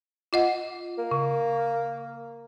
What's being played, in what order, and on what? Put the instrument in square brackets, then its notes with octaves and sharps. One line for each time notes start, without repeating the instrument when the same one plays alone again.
[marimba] F4 D#5 F#5
[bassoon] A#3
[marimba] C#3